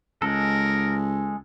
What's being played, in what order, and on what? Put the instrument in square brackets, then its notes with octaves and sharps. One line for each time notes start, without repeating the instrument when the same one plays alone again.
[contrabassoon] C#2 [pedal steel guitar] G#3 A4 [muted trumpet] A#4